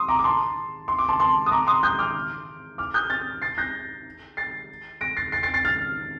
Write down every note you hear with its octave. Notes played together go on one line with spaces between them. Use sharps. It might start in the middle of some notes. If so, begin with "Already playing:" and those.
Already playing: C6 D#6
A#5 D6
D6
A5 C6
C6
D6
A5 C6
A5 C6
D#6
A#5 D6
C6 D#6
D#6 G6
D6 F6
D6 F6
D#6 G6
F6 A6
A6 C7
G6 A#6
A6 C7
A#6 D7
A6 C7
A6 C7
A6 C7
A6 C7
F6 A6